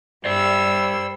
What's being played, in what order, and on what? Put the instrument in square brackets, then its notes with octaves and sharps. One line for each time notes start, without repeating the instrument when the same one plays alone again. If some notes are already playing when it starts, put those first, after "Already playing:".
[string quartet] G2 G3 E6 [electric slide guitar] C5 D5